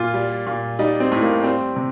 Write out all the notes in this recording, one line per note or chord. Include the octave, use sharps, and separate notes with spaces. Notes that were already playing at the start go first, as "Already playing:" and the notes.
Already playing: A#2 F4
G3
A#2
G3 D#4
C4
A2
A#3
G3 C4
C3